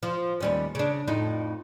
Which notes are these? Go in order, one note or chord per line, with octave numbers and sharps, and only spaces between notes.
F3
D#2 G3 C#4
C#3 D4
F2 A2 D#4